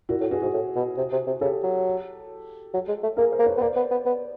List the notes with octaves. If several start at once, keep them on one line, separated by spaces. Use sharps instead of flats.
A#2 E4 F#4
A2
G2 F#4 G#4
G#2 F#4 G#4
A2
B2
C3
C3
C3
C#3 G4 A4
F#3
F#3
G#3
A3
A#3 G#4 A#4
A#4 C5
A#3
B4 C#5
B3
A#3 C5 D5
B3
B3
B3